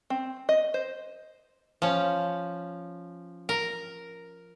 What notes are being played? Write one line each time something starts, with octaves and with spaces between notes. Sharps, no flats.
C4
D#5
C5
F3 C#4
A#4